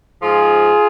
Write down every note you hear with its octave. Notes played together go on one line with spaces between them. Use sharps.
G#2 F3 F4 G#4